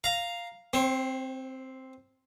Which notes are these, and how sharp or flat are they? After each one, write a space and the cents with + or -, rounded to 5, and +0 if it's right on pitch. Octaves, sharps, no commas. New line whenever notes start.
F5 +0 A#5 +0
C4 +0 C5 +45